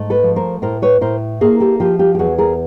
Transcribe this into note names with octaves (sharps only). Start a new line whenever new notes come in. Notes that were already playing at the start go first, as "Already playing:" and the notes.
Already playing: G#2 A3
A4 B4
F3
A#4 C5
A2 A#4 C5
B4 C#5
A2 A#4 C5
A#3 G#4 A#4
G4 A4
F3 F4 G4
F4 G4
G4
E2 F#4 G#4
G#4 A#4